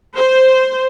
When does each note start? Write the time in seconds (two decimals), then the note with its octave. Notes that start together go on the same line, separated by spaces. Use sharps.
0.17 C5